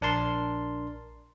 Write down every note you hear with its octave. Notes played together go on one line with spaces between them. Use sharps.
A#1 D4 A#4 A5 C6